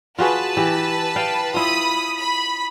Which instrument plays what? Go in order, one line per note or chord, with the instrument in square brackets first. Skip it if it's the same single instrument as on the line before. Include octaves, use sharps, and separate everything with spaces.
[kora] F4 F#4 G#4 [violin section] B4 A5
[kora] E3 G4
F5 G5
[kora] E4 F4 [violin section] B5 D#6
[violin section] B5